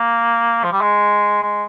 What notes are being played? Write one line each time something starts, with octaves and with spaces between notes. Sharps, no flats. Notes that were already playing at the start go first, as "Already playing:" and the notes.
Already playing: A#3
F3
G3
G#3
G#3